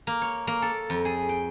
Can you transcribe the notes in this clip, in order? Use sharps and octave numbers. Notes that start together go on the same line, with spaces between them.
A#3
C#5
A#3
A4
F2
G#4
G5